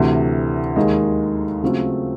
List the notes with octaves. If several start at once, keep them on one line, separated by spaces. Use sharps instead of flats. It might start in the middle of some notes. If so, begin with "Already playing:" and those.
Already playing: D2 C3 E3
D#2 D#3 G#3
C#3 F#3 A3 C4 F4